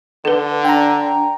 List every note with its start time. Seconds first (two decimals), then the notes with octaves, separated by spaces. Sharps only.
0.25 D3 A4 B4
0.65 D4 G5 A#5